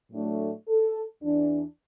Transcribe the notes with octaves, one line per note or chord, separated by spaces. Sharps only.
A2 F#3 A3 D4
A4
E2 E3 D4